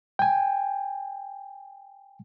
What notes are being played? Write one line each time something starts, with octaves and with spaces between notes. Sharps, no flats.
G5 G#5